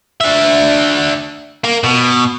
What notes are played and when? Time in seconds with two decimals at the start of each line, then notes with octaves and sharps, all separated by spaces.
0.21 D4 E5
1.64 A#3 A#4
1.84 B2